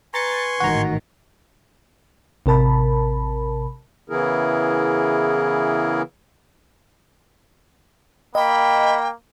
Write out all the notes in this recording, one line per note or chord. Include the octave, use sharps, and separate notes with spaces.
B4 G#5 A#5 C6 C#6 A6 C#7
A1 G#2 D#3 F#4 A#5
A1 C3 A#4 A5 B5
C#3 E3 B3 E4 G#4 A#4
A#3 D#5 G5 B5